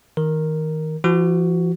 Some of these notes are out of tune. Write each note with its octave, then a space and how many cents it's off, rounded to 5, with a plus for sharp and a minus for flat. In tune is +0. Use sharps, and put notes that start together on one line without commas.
D#3 +25 A#4 +0
F3 -40 F#4 +10